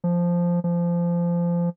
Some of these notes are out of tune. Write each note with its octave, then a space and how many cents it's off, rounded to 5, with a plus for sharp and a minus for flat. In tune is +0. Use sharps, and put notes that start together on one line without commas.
F3 -5
F3 -20